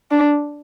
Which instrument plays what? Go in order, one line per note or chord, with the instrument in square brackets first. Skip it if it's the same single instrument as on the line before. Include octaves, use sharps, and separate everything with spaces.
[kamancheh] D4